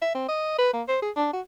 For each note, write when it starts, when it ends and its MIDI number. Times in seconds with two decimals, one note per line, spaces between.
0.02 0.14 76
0.15 0.28 60
0.28 0.58 75
0.59 0.72 71
0.73 0.82 58
0.88 1.00 72
1.02 1.11 68
1.16 1.29 62
1.33 1.41 66